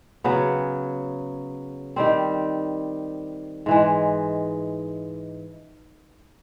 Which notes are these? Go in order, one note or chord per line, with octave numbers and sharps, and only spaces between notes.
C#3 F#3 B3
D#3 G3 C4
G#2 E3 G#3